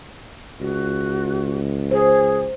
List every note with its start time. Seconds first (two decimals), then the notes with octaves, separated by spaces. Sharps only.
0.60 C#2 F#4
1.91 G#4 C5